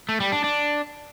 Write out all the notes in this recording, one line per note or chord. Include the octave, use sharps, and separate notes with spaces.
A3
G3
D4
D4